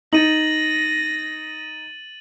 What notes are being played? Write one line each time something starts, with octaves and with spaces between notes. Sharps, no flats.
D#4 A6 A#6 D#7 F#7